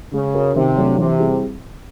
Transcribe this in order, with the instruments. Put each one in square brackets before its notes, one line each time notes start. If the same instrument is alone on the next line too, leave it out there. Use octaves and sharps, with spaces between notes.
[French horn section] C#3 [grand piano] G#3
[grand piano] C#4 F#4 A#4
[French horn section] C3 [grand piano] D#3
[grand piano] F#3 A3 D4
[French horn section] C3 [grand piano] E3
[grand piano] G3 C4 E4 G#4